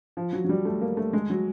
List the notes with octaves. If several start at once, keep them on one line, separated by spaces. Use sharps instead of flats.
F3
F#3
F#3
G3
A3
A#3
A3
G#3
F#3